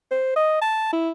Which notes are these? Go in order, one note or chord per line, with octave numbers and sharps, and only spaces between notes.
C5
D#5
A5
E4